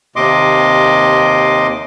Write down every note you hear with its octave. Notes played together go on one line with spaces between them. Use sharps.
D#2 C3 D#5 C6 D6